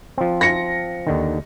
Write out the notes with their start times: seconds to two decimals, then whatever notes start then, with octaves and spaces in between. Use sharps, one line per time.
0.18 F3 C4
0.41 A#6 C#7
1.07 D#2 D3 D#3